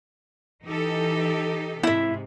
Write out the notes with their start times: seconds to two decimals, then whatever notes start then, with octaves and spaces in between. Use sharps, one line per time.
0.65 E3 D#4 G4 A4
1.83 G#2 C3 E4 E5